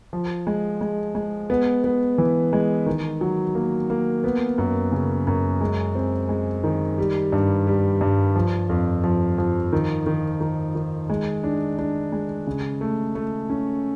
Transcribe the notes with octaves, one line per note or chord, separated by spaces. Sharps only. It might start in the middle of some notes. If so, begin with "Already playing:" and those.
F3
G#3
G#3
G#3
B3
B3
E3
G#3
D#3
F#3
A#3
A#3
B3
F#2
C#3
F#2
G#3
C4
G#3
D#3
G3
G2
G3
G2
F3
F2
F3
F3
D#3
D#3
D#3
D#3
G#3
D4
D4
G#3
C#3
A3
A3
C#4